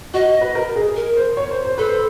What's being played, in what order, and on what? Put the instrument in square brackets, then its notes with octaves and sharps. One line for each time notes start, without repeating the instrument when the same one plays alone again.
[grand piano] F#4 [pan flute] D#5
[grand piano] B4
A#4
G#4
[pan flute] A#4
[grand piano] C5
C#5
C5
C5
[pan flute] A4 [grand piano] B4
[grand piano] C5